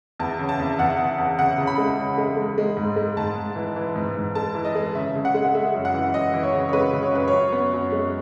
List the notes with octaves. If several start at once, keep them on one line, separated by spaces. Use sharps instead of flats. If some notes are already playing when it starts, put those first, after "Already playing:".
E2 A5
C#3
A5
E2
E2 F#5
E2
E2
C#3 F#5
C#3
B5
G#3
C#3
G#3
G#3
G#3
G#2
G#3
G#2 A5
G#2
E3
E3
G#2
G#2
G#3 A5
E3
D#5
G#3
C#3 E5
C#3
F#5
G#3
F#5
G#3 E5
F#2
F#5
E3
F#2 D#5
E3
C#5
C#3
C#5
G#3 B4
C#3
C#5
F#2 B4
C#5
F#2
B3
F#2
G#3